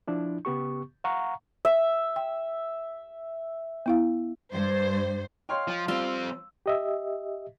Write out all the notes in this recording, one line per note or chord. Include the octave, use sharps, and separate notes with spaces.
F3 D4 E4
C#3 B3 G4 C#6
F5 F#5 A#5 C#6
E5
G5
B3 E4 F5
G2 C5
C#5 D#5 F5 G5 C6 F6
F3
F3 G3 C4 F4 E6
G4 D#5 E5